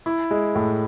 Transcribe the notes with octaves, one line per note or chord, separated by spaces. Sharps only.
E4
G#3
A2